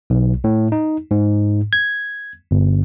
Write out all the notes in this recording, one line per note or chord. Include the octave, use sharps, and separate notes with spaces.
B1
A2
D#4
G#2
G#6
G1